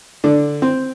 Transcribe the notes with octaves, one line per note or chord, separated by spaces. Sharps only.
D3 D4
C4